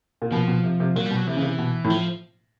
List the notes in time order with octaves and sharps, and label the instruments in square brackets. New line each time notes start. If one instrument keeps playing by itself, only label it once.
[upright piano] A#2
[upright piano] B2 [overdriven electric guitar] F3
[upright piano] B2
C3
C3
[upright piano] A#2 [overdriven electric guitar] F#3
[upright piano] B2 [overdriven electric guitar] G3
[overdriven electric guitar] F#3
[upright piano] C3 [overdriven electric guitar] E3
[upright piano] C#3
C3
B2
A2
[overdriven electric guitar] F3